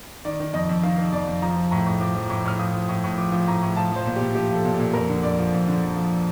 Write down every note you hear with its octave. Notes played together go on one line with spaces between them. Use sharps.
D#3 D5
D#3
F2 D#5
F2
D#3 F5
D#3
F2 D5
F2
F3 A#5
F3
A2 A#5
A2
F3 D6
F3
A2 D6
A2 F6
F3 D#6
F3
A2
A2
F3 D6
F3
A2 A#5
A2
F3 A5
F3 C5
A#2
A#2 G4
F3 G4
F3 A4
A#2
A4
A#2
F2 A#4
D3
F2 D5
F3
F2
D3
F2
F3